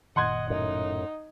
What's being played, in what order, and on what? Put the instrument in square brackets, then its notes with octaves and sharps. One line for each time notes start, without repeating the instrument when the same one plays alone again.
[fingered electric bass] F#1 A#2 D#3 [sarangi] D#5 [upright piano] F#5 C6 G#6
[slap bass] F#2 A2 [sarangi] D#4